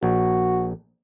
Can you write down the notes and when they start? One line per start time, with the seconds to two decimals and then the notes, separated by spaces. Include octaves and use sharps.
0.03 A#1 F#4